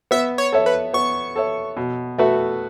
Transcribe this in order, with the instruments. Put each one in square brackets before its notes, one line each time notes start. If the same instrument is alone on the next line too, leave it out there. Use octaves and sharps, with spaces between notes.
[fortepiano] B3 [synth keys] E5
[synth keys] C#5
[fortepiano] A4 C#5 E5
[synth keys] B4
[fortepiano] B3 [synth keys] C#6
[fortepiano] A4 C#5 E5
B2
A3 F#4 B4 E5